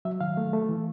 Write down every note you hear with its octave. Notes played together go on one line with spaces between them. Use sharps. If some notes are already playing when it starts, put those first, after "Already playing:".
F#3 E5
D#3 F5
A3
A3
E3